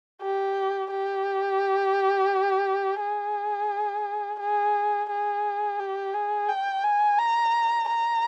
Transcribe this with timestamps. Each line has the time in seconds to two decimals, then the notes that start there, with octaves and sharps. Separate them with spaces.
0.22 G4
0.91 G4
3.00 G#4
4.40 G#4
5.10 G#4
5.80 G4
6.14 G#4
6.49 G5
6.84 G#5
7.19 A#5
7.89 A#5